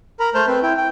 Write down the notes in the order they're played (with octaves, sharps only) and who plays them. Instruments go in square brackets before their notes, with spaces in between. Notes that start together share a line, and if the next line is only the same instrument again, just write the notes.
[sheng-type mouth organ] A#4 A#5 B5
A3 C5 A5 F6 G6
C4 B4
E4 G5
G5